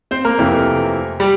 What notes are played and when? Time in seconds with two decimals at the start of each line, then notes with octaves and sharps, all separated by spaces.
0.11 C4 C5
0.25 A#3 A#4
0.39 F2 C3 E3 A3
1.20 G3 G4